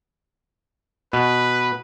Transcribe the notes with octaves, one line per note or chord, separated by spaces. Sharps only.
B2 B4